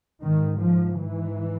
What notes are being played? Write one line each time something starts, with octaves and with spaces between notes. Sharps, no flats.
G#2 D#3
F3
G#2 E3